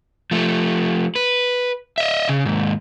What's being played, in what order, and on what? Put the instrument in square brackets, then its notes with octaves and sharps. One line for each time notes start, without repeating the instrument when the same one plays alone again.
[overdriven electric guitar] F3 A3
B4
D#5 E5
C#3
D#2 G#2